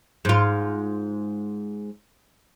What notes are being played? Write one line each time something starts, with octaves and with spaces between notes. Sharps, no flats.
G#2 F4